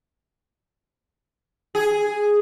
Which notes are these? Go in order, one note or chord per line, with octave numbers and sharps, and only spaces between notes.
G#4